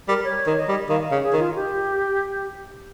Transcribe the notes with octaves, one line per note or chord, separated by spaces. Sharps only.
G3 A#4
C#5
D#3
D#5
G3
D#3 F5
D#5
C#3 F5
G#4
D#3
F4
G4